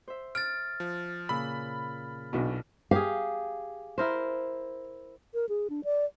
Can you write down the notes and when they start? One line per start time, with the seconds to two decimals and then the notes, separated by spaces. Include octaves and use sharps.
0.08 C5 E5
0.35 F6 A6 D7
0.80 F3
1.29 A#2 C#3 B5 E6
2.33 B1 B2 D4 E4 F#4
2.91 G4 G#4 F5
3.98 E4 A#4 C5
5.34 A#4
5.49 G#4
5.70 D4
5.84 D5